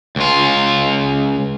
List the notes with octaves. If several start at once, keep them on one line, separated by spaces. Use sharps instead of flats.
C#2 F4